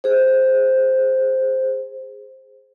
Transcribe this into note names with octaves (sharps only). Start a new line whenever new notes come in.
G#4 C5